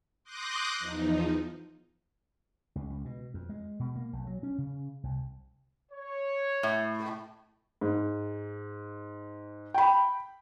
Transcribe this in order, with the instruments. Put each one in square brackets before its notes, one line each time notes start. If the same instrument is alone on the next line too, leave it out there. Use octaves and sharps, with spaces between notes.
[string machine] C6 D6 D#6 F#6 G6 A#6
E2 F3 D#4
[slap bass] C#2
C#2
B2
F2
G#3
B2
A#3
B1
F#3
C#4
C#3
C2
[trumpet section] C#5
[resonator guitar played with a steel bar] A2
[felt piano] G#2
G5 B5